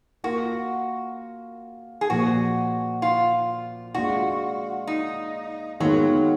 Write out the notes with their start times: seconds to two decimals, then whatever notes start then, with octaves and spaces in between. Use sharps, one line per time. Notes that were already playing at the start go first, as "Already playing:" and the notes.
0.24 A#3 F4 F#4 A#4
2.01 G#4
2.10 A#2 F3 A#3 F#4
3.02 F4
3.94 G#3 D4 F4 F#4
4.87 D#4
5.80 D#3 F#3 G#3 B3 F4 A#4